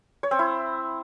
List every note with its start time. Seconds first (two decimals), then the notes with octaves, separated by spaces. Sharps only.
0.23 C#5
0.31 C4
0.39 E4